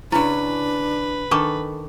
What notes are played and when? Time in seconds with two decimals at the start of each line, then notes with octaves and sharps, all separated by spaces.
0.12 C#3 C#4 D4 E4 B4
1.31 D#3 D4 A4 C#6 D6